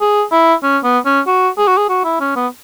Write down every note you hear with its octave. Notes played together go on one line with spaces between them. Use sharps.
G#4
E4
C#4
B3
C#4
F#4
G#4
F#4
G#4
F#4
E4
C#4
B3